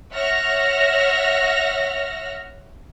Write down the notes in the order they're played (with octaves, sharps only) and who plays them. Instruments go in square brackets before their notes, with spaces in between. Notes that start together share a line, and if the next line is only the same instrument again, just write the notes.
[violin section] C#5 E5 F#5 F6 A#6